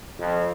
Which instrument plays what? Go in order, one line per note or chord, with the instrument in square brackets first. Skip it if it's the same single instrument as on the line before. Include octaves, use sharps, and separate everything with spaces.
[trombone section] F2